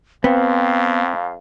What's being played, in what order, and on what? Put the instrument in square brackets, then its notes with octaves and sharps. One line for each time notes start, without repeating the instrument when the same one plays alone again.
[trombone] F2 [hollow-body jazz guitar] B3 [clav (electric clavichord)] C4 [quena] F5